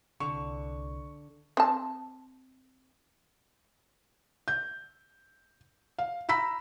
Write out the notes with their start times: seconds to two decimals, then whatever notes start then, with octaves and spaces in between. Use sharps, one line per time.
0.20 C2 D3 C#6
1.57 C4 A5
4.48 G6
5.98 F5
6.29 A#5 B5 E6 B6